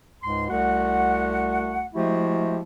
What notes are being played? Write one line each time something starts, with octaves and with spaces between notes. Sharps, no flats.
C#2 G#2 C6
C2 A3 F#4 F#5
F3 G#3 A3 E4 F#4 G4